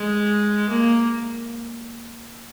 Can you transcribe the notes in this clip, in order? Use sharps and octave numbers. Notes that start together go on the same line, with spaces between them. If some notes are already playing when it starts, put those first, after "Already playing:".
Already playing: G#3
A#3